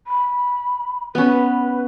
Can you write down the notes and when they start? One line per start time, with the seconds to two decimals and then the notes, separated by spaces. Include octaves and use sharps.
0.07 B5
1.15 B3 C#4 B4